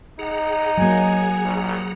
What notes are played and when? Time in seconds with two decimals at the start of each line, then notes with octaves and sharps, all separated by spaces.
0.19 D#4 G#4 F#5 A#5
0.78 F#3 A#3 G#5
1.45 A#1